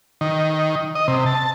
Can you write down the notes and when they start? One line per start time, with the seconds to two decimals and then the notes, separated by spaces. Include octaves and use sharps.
0.21 D#3
0.95 D#5
1.08 C3
1.26 A5